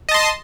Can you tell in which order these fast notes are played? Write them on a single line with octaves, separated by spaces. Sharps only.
D#5 A5 C6